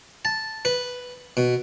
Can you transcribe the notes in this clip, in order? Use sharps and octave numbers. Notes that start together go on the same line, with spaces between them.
A5
B4
B2